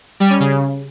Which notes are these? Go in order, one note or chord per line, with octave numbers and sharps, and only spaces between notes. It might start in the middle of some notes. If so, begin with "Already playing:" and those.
G3
C#4
C#3